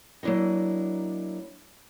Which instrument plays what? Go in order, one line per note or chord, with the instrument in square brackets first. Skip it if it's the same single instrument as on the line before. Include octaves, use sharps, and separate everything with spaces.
[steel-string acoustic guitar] F#3 A#3 D4 E4 D#5